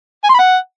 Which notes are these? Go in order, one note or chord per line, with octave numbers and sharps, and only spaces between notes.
G#5
C6
B5
F#5